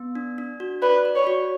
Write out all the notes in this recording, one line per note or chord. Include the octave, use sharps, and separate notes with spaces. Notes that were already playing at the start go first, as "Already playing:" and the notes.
Already playing: B3
D4
D4
F#4
B4 D5
D5
C#5
F#4